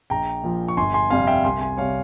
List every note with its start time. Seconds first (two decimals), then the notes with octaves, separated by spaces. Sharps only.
0.10 A#1 G5 A#5
0.43 A#2 F3
0.68 C#6
0.77 G1 G#5 C6
0.94 G#5 C6
1.10 F2 C3 G3 F5 G#5
1.27 E5 G5
1.44 C2 G#5 C6
1.61 G#5 C6
1.77 C3 G3 C#5 F5